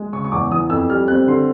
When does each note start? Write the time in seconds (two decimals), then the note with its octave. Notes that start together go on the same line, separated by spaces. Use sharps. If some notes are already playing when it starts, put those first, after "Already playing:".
Already playing: G#3
0.13 C#3 C#6
0.24 C#6
0.32 E2 D6
0.51 E3 D#6
0.69 F2 E6
0.89 G3 F6
1.08 C4 F#6
1.27 D3 C6